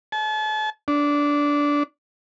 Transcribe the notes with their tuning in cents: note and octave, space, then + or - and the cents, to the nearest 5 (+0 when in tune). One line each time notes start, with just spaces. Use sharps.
A5 -40
D4 -15